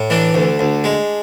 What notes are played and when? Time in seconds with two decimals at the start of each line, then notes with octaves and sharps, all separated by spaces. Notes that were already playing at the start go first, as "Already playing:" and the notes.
Already playing: A2
0.10 E3 D4
0.34 D2
0.59 D2
0.84 G#3